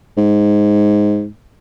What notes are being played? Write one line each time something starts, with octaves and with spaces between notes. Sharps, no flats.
G#2